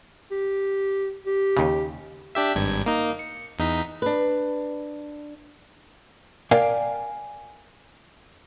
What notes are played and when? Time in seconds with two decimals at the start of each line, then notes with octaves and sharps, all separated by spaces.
0.31 G4
1.27 G4
1.57 D#2 C#3
2.35 D4 G4 E5
2.55 G#1 G2 G#6
2.86 A#3 D#4
3.19 C#7
3.59 E2 D#4 B6
4.02 D4 B4
6.51 A#4 D5 F5 G5 G#5